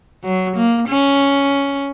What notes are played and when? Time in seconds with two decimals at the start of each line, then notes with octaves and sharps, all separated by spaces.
0.24 F#3
0.56 A#3
0.88 C#4